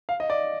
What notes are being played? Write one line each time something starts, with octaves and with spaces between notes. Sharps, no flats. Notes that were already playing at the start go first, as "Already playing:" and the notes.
F5
D#5
D5